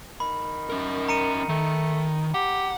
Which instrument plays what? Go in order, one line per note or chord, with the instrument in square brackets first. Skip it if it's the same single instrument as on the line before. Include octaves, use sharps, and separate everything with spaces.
[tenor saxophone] D#3 [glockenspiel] B5
[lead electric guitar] C#4 A#4
[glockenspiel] A#5 C#7 D#7
[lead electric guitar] D#3 [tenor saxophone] A3
[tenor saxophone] G4 [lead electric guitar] F#5